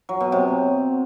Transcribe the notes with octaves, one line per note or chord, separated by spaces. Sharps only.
F#3
B2
C3